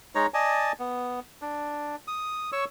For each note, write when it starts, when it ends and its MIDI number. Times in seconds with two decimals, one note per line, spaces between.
0.15 0.27 56
0.15 0.27 63
0.15 0.27 73
0.15 0.27 82
0.34 0.72 74
0.34 0.72 75
0.34 0.72 80
0.34 0.72 81
0.79 1.20 59
1.42 1.96 62
2.08 2.50 87
2.52 2.65 73
2.52 2.65 85
2.52 2.65 88